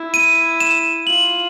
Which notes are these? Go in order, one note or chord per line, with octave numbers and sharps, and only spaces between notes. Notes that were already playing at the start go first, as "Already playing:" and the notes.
Already playing: E4
D#7
E7
F4 F#7